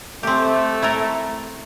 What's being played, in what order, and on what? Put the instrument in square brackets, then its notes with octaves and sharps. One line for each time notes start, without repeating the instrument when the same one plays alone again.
[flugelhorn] A3 [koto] C4 G4
[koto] E4 A4 A#4